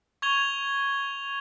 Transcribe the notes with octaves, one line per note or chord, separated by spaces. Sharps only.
C#6 G#6 F7 G7